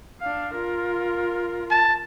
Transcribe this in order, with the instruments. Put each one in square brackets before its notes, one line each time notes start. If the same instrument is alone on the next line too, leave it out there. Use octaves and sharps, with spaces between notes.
[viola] D4 F5
F4 A#4
[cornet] A5